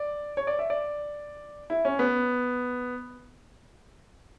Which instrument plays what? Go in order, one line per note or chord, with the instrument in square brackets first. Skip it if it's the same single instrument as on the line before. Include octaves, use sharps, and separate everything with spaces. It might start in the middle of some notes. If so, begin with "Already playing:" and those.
Already playing: [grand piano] D5
C#5
D5
E5
D5
E4
C#4
B3